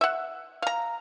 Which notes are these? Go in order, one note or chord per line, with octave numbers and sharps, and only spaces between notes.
E5 F#5
F5 A#5